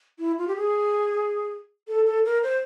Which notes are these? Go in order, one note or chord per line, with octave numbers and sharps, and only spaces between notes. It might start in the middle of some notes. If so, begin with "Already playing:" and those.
E4
F4
G4
G#4
A4
A4
A#4
C5